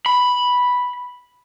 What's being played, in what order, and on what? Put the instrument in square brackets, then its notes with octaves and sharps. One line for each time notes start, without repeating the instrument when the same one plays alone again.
[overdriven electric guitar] B5